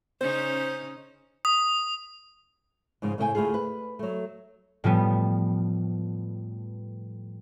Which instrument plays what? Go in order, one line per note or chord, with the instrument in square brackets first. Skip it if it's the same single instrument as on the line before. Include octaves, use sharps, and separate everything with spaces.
[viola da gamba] C#3 C#4 D#4 [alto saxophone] C5
[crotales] D#6
[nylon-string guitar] G#2 C#3 F3 G#3
A2 C#3 A3 D#5 G5 G#5
D2 A3 E4 F4 G#4
B4
F#3 A3
[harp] A2 F3 G3 B3